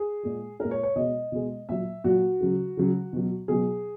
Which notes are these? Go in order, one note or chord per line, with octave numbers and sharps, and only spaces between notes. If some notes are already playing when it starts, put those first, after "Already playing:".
Already playing: G#4
A#2 G#3
A#2 G#3 A#4
C#5
C#5
B2 G#3 D#5
B2 G#3
A#2 F#3 E5
A#2 F#3 F#4
C#3 F#3
C#3 F#3
B2 F#3
B2 F#3 G#4